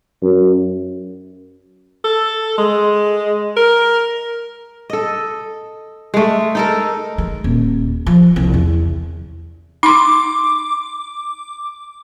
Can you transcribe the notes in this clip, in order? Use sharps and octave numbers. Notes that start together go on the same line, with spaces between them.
F#2
A4
G#3
A#4
A4 D#5
G#3 A3
D#4 A4 A#4
G#3
D#1
F3
C2
E2
D#4 C6 D6